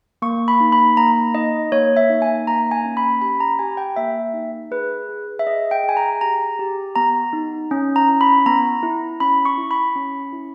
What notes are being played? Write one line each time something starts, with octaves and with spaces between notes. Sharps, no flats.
A#3 C#6
B5
D#4
B5
A#3 A#5
D#4 D#5
A#3 C#5
E5
D#4
G#5
A#3 A#5
G#5
C#4
B5
G4 B5
A#5
G4 G#5
G5
A#3 E5
D#4
G#4 B4
G#4
E5
G#4 D#5
G5
G#4 G#5
A#5
G4 A#5
G4
B3 A#5
D#4
C#4
A#5
E4
B5
B3 A#5
E4
C#4 B5
C#6
E4
B5
C#4
E4